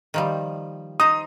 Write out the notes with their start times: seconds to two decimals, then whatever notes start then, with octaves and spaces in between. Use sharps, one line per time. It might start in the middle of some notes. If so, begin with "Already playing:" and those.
0.14 D#3 F3 G3
1.00 D#4 C5 D#6